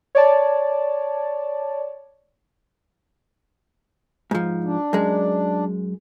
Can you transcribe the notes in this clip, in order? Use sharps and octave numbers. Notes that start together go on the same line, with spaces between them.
C#5 D5 A5
G#2 F3
D4
F#2 G#3